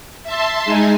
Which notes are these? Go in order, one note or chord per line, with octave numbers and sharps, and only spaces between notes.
E5 A5 C6
G#3 D#4 G#5